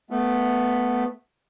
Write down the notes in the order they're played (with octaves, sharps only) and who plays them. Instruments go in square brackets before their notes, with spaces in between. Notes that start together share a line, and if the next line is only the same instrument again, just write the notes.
[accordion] A3 B3